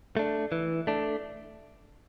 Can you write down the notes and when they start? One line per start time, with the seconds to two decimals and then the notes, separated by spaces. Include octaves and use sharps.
0.17 A3 D4
0.52 E3
0.87 A3 D4